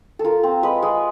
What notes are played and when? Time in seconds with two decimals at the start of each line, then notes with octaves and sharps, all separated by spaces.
0.19 A4
0.24 F4 A#4
0.43 C4
0.63 G#3 B4
0.82 G#3